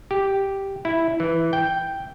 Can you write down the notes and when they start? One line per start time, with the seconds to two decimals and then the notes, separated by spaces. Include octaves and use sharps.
0.11 G4
0.85 E4
1.20 E3
1.53 G5